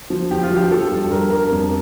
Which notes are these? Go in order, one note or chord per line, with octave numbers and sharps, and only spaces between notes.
F3
F3 G4
F4
F3
G4
F3 A4
G2
G2 A#4
G2 A#4
F2